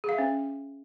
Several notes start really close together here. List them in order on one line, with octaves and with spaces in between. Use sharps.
G#4 F5 E5 C#4